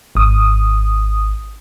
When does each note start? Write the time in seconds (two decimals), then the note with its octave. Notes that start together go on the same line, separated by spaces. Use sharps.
0.15 G#1 D#6